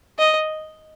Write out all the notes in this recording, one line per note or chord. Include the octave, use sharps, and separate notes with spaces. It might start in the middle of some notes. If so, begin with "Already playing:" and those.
D#5